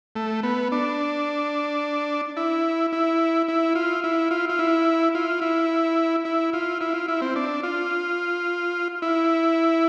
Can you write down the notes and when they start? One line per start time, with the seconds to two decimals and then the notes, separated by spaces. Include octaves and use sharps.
0.16 A3
0.43 B3
0.72 D4
2.37 E4
2.93 E4
3.48 E4
3.75 F4
4.04 E4
4.31 F4
4.49 F4
4.59 E4
5.15 F4
5.41 E4
6.25 E4
6.53 F4
6.81 E4
6.94 F4
7.08 E4
7.21 C4
7.36 D4
7.63 F4
9.02 E4